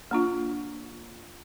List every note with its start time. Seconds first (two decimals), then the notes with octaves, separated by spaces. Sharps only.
0.11 A#3 D4 F4